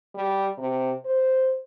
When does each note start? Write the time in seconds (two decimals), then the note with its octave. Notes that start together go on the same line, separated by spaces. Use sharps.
0.14 G3
0.58 C3
1.05 C5